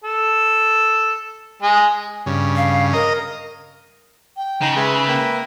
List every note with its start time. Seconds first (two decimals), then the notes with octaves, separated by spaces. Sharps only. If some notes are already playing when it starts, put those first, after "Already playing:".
0.04 A4
1.62 G#3 G#4
2.26 G2 C#3
2.56 F5
2.93 A#4 D#5 A#5
4.37 G5
4.62 C#3 D#4
4.76 G#3 B4 E5
5.08 A#3 G5